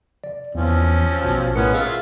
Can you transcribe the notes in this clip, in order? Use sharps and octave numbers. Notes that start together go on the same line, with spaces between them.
D5
E2 E3 F3 C4 C#4
A#1 B2 A5
A2 G#3 B3 C#4 A#4 C#7
F4 G#4 E5 F5